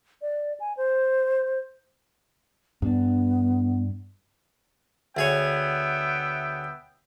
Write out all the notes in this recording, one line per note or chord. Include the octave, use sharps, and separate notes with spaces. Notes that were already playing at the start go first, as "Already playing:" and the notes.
D5
G#5
C5
G2 B3 D4
D2 B3 G#4 C#5 E5 G5